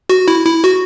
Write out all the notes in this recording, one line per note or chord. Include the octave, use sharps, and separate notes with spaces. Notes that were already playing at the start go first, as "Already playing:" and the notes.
F#4
E4
E4
F#4